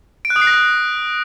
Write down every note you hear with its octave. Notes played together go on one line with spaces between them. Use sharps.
D7
F#6
D#6
C7
A#6